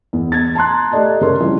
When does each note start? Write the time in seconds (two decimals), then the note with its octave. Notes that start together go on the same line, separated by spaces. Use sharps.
0.13 E2
0.32 G#6 A6
0.55 A5 A#5 C6 F#6
0.92 A3 G4 A4 D5 D#5 A5
1.21 C#3 A#4 C#5 C6
1.40 F3 G3 C4 C#4 E4 F4